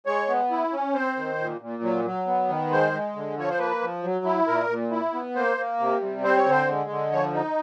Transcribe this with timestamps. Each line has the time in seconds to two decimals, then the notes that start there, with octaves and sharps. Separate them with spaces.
0.06 G#3 C#5
0.28 B3
0.51 E4
0.72 C#4
0.94 C4 C5
1.17 D#3
1.39 A#2
1.61 A#2
1.83 F#3
2.05 F#3
2.27 B3
2.49 D#3
2.71 G#3 C5
2.93 G#3
3.15 D3
3.37 F3 C#5
3.49 C5
3.59 A#3 B4
3.81 F3
4.03 F#3
4.25 E4
4.47 A#2 A#4
4.70 A#2
4.91 E4
5.13 B3
5.35 A#3 C5
5.57 A#3
5.80 C3
6.02 G3
6.24 C4 C5
6.37 C#5
6.46 D3 C5
6.68 G#3
6.90 D3
7.12 F3 C#5
7.34 D#4